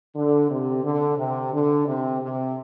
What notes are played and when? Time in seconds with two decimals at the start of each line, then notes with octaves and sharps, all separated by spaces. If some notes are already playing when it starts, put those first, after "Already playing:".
0.15 D3
0.50 C3
0.84 D3
1.18 C3
1.53 D3
1.87 C3
2.22 C3